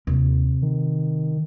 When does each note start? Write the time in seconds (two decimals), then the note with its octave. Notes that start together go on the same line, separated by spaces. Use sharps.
0.07 D#2 C3
0.62 D#3